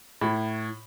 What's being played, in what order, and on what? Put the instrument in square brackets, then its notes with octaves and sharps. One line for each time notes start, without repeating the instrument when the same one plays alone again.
[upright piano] A2 B5